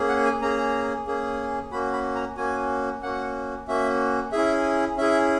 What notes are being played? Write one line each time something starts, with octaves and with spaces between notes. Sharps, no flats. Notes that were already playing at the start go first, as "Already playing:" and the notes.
Already playing: A#3 C#4 G#4
F#5
G#5
A#3 C#4 G#4 A#5
A#3 C#4 G#4
A#3 C#4 F#4 B5
B5
A#5
A#3 C#4 F#4 G#5
A#3 C#4 F#4 F#5
A#3 C#4 F#4 E5
C#4 E4 G#4 E5
C#4 E4 G#4 E5